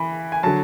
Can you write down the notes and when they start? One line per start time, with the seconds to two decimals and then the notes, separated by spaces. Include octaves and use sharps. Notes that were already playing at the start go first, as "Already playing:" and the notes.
Already playing: E3 B5
0.32 G#5
0.43 D3 F#3 A5